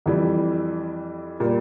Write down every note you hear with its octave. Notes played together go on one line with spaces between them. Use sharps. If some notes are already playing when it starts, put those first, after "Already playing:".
F2 E3 G3
A#2 G3 A#3